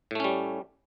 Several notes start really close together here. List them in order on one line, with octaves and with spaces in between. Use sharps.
A2 A3 C#4 G3